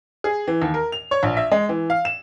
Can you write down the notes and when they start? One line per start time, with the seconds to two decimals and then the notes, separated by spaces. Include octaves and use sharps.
0.24 G#4
0.48 E3
0.62 D#2
0.74 A#4
0.92 F7
1.11 C#5
1.23 A#1
1.37 E5
1.51 G#3
1.69 E3
1.90 F5
2.05 E7